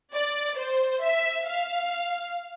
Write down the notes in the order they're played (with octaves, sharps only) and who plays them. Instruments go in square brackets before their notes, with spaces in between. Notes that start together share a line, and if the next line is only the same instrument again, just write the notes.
[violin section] D5
C5
E5
F5